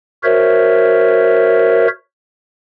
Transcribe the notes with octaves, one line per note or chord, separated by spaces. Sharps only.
F#4 A#4 C5 C#5 E5